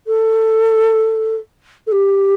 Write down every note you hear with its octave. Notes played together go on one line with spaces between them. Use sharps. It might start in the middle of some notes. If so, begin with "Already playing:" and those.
A4
A4
G4